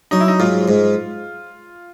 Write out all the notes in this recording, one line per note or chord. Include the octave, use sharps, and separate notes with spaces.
F#3 D#4
E4
D#4
G#2 F4
G#2